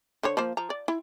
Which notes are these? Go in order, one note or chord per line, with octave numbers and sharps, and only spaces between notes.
D3 C5 C#5
F3 A#3 C5
F3 A#5
D5
E4